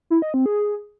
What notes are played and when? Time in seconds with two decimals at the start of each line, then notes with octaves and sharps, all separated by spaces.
0.10 E4
0.22 D#5
0.34 C4
0.46 G#4